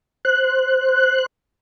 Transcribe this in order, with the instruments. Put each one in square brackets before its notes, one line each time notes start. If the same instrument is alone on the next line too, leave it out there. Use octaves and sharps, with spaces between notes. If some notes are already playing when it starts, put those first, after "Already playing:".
[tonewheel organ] C5 F#6